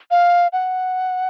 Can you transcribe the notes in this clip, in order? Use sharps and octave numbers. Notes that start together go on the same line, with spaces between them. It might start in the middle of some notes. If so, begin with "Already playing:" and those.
F5
F#5